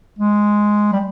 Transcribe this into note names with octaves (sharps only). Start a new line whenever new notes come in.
G#3
G3